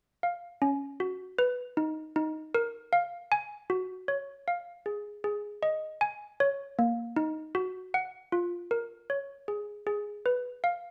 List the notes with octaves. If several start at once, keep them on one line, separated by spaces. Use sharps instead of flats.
F5
C#4
F#4
B4
D#4
D#4
A#4
F5
G#5
F#4
C#5
F5
G#4
G#4
D#5
G#5
C#5
A#3
D#4
F#4
F#5
F4
A#4
C#5
G#4
G#4
B4
F5